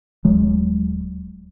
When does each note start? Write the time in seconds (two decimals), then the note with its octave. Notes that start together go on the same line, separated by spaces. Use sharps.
0.25 D#1 F#3 G#3